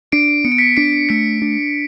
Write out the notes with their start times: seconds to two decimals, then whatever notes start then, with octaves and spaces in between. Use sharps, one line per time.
0.12 D4 C7 D7
0.45 B3 C#7
0.52 D7
0.58 B6 C#7
0.77 D4 C7 D7
1.09 A3 B6 C#7
1.42 D4